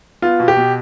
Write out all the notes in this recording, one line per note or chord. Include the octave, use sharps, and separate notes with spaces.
B3 F4
B2
G4
B2